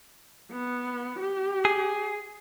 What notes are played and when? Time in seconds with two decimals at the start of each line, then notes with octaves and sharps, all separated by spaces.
0.51 B3
1.20 G4
1.65 G#4